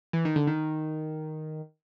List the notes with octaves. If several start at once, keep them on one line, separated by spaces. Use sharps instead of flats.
E3
D#3
D3
D#3